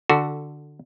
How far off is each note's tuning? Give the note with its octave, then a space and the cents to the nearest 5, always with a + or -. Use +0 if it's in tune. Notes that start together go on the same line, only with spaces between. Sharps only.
D3 +10 F#4 +0 A4 +0